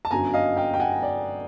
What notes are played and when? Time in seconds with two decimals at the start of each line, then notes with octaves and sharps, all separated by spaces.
0.05 A5
0.11 G1 F#2 D3 F#3 G#5 A#5
0.34 D#5 F5
0.57 F5 G5
0.74 G5
0.80 F#5 G#5
1.03 D5